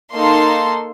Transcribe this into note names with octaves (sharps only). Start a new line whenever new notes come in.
A#3 D#4 A4 C6